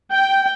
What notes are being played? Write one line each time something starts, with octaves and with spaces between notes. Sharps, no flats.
G5